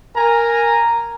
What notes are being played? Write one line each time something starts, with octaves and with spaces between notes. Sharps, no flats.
A#4 G#5 A#5